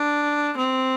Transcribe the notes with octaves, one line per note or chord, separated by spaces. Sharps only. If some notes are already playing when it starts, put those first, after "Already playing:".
Already playing: D4
C4